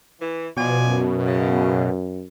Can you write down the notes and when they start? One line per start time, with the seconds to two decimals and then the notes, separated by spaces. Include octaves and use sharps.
0.20 E3
0.57 B2 F3 D5 G#5
0.86 F#2
1.25 C#3